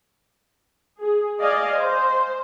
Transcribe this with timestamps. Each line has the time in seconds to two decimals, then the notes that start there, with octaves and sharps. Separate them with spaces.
1.02 G#4
1.41 D5 D#5 F5 G#5
1.77 C5